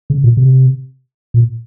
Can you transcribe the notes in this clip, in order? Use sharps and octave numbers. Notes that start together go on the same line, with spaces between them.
C#3
A#2
C3
A#2